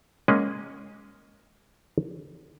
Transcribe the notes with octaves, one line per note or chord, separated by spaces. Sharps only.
G#3 A#3 C#4 G#4 D#5 F#5